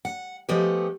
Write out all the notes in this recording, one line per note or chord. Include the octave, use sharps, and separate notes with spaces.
F#5
F3 G#3 A3 B3 G4